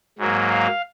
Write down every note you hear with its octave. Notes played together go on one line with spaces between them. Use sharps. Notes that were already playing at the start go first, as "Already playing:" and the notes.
G#2 F#3 A#3
F5